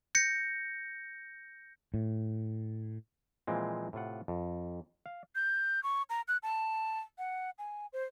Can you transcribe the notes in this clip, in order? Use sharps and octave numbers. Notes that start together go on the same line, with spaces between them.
G6 A#6 C#7
A2
A#2 E3 F3 G#3 C4
A2 C3 F4 F#5
F2
F5
G6
C#6
A#5
F#6
A5
F#5
G#5
C5